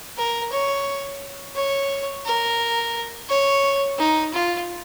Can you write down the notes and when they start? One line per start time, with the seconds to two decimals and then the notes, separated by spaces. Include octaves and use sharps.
0.18 A#4
0.52 C#5
1.56 C#5
2.26 A#4
3.29 C#5
3.99 D#4
4.34 F4